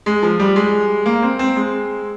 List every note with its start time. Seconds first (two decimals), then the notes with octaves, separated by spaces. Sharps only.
0.06 G#3
0.22 F3
0.39 G3
0.56 G#3
1.06 A#3
1.22 C4
1.39 C4
1.56 G#3